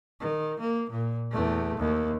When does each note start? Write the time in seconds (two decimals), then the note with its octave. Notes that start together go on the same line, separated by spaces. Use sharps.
0.20 D#3
0.60 A#3
0.90 A#2
1.31 E2 A3
1.78 D#2